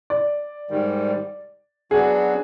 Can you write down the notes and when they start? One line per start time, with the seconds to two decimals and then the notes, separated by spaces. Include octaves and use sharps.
0.10 D5
0.70 G#2 D#3 G3
1.91 F#3 B3 D4 F#4 G#4